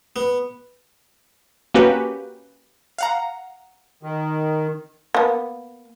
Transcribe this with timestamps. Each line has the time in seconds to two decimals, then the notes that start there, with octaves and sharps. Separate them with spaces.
0.16 B3
1.74 A#3 C#4 F#4 G4 B4
2.98 F5 F#5 A#5
4.03 D#3
5.15 A#3 B3